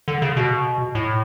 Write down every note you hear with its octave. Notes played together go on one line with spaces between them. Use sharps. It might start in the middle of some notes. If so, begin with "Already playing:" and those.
D3
C#3
B2
A2